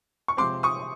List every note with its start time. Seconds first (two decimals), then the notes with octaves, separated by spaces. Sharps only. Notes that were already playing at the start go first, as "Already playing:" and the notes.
0.28 C#6
0.37 C3 F3 G#3 C4 C6 D6
0.63 C#6 D#6